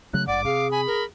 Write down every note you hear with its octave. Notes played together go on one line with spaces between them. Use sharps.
C#3 F#3 A3 F#6
G#1 G2 D5 F#5 D6
C3 G#4 F5
G#5 B5
A#4